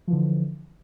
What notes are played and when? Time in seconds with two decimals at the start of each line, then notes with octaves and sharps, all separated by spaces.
0.08 F3
0.10 E3
0.13 D3